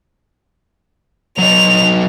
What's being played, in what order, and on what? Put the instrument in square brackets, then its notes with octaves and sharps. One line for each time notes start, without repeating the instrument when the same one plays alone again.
[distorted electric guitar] F#3 D#4 [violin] F7